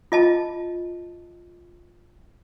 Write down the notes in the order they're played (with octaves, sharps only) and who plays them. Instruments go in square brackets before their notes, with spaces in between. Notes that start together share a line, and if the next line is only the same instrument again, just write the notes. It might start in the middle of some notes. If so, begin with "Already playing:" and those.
[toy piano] F4 D#5 A5